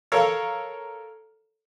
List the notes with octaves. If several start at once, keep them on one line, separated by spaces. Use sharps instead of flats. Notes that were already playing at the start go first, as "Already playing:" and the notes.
A4 A#4 C#5 F5